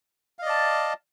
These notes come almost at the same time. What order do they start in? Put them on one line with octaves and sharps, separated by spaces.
F5 D#5 D5 A5